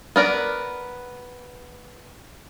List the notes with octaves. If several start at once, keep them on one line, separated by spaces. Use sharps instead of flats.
B3 A#4 D5